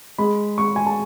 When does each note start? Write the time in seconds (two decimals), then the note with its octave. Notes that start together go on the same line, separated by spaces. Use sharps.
0.18 G#3 B5
0.58 G#3 C#6
0.76 G#5
0.87 A5